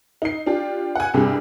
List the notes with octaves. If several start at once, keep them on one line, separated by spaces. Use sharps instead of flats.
D#4 C7
D4 F4 G4
F#5 G#5
C2 G2 G4 G#4